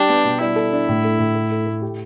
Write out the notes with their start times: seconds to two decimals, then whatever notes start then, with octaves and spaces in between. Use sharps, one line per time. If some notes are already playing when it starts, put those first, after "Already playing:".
Already playing: G3 D4 G4
0.09 B3
0.25 B2
0.40 G3 E4
0.56 A4
0.73 D4
0.89 A2
1.04 A3
1.19 A2
1.35 A3
1.51 A3
1.67 A3
1.82 G4